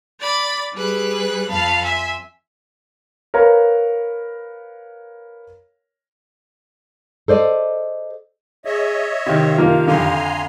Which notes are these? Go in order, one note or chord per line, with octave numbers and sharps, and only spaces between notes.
D5 B5 A6
G3 G#4 B4 F#6
F2 F5 A5 B5
E5 G#5 C6
A#4 B4 C#5 F5 A#5
A4 C5 D5 D#5
G#4 C#5 D#5 E5
C3 D#3 F5
F3 A#3 F4
F2 D3 G#5 A#5 C6